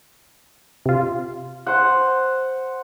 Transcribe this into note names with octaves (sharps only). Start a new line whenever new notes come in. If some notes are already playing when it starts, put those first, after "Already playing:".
C3 F4
C5 F#5